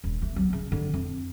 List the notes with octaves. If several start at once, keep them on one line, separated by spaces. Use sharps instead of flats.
D#1
A3
F#3 B3
C#3
D3
F2